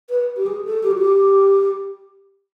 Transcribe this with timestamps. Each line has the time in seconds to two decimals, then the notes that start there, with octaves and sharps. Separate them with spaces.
0.09 B4
0.36 G4
0.46 G#4
0.65 A4
0.83 G4
0.91 F#4
0.98 G4